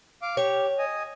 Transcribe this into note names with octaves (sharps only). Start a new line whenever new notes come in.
F5 D6
G4 C#5
D#5 G#5